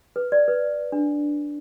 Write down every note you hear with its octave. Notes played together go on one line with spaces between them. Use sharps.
B4
D5
B4
D4